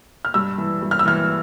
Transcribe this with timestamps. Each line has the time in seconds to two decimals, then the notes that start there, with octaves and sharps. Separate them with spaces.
0.25 F6
0.34 G2 E6
0.58 E3
0.82 G2
0.91 F6
0.99 E6
1.06 E3 F6